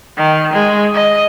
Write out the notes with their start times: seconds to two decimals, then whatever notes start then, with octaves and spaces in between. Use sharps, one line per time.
0.17 D#3
0.53 G#3
0.94 D#5